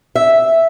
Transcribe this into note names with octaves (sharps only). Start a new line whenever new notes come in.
E5